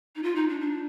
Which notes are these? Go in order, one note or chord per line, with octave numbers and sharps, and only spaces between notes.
D#4
F4
D#4
D4
D4